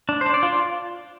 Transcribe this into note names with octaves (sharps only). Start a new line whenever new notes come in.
D4
C5
D4
D5
F4